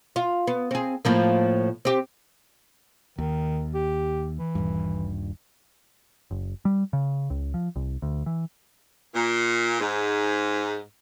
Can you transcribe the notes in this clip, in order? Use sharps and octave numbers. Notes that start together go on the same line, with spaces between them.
F4
B3
C4 G#4
A2 F3 A#3
C4 G4
D#2 D#3
G4
E3
D#1 G2
F#1
G3
C#3
C#2
F3
C2
D2
E3
A#2
G#2